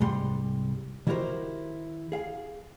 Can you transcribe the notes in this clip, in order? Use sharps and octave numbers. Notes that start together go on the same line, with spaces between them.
C2 G#2 G3 C6
D#3 E4 F#4 G4 A#4 C5
G#4 F5